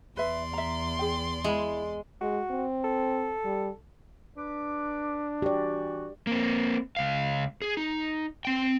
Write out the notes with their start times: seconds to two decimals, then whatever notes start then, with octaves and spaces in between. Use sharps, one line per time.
0.17 E2 B4 D5 E5 C6
0.53 E5 A#5
0.99 G#4 G5
1.44 G#3 E4 B5
2.21 G#3 F#4
2.51 C4
2.84 A4
3.44 G3
4.37 D4 B4 D6
5.42 E3 F#4 G4 D5
6.27 A#3 C4
6.97 C#2 F5
7.62 G#4
7.77 D#4
8.45 C4 G5